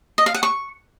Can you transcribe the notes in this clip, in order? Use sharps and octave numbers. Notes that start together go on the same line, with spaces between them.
D#5
F5
F#5
C#6